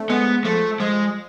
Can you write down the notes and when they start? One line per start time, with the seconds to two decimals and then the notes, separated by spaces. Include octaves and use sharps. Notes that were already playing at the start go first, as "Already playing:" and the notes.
Already playing: A3 C4 D4
0.09 G#3 B3
0.45 F3 A3
0.80 F3 G#3